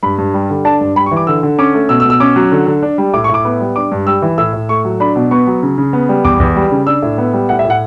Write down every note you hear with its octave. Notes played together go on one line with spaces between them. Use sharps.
G2 B5
G2
G3
D3
D4 A5
G2
G3 B5
C#6
E3
D6
D3 E6
D3
C#4 D6
A3
B2 E6
E6
B2
E6
C#4 D6
F#3
D3
D3
D4
G3
A2 D6
C#6
A2 D6
B3
G3
D4 D6
G2
G3 E6
E3
A2 E6
A2
A3 C#6
F#3
D4 B5
B2
B3 C#6
F#3
C#3
C#3
B3
G3
E2 D6
E2
G3
C#3
D4 E6
A2
B3
G3
A2 F#5
E5
A2
F#5